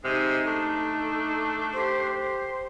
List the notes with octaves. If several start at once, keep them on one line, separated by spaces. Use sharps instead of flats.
C3 G#3 D#4
A3 D4
G4 C5
C5